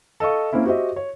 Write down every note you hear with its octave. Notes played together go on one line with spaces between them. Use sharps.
A4 D#5 F5 C#6
A#3 C4 C#4 E4
F#4 G4 C5 D#5 E5
C#5